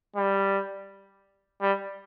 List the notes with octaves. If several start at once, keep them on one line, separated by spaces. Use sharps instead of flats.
G3
G3